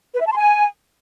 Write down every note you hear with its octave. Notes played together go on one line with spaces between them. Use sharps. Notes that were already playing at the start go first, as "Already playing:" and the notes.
B4
E5
A5
C6
G#5